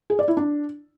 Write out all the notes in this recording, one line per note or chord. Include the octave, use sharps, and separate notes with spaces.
G#4
D5
E4
D4